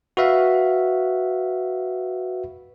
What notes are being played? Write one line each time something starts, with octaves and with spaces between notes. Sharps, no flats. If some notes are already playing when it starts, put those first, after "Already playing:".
F#4 B4 E5 F5